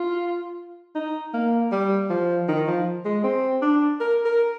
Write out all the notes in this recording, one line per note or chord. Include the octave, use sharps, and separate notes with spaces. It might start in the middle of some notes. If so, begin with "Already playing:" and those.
Already playing: F4
D#4
A#3
G3
F3
D#3
F3
G#3
C4
D4
A#4
A#4